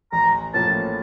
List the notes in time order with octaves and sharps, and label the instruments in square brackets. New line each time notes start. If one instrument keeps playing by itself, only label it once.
[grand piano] A1 [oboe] A#5
[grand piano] A2 F3 A#3 C#4 [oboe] A5